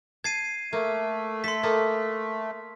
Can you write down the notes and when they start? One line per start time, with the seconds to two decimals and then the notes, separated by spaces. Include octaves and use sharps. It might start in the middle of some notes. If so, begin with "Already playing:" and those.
0.24 A5 G#6 C7 D#7
0.73 A3 A#3
1.44 A4 C6 B6
1.63 A#3 A4 D#5